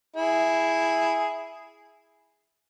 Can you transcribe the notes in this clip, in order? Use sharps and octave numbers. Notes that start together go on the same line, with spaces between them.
E4 G#4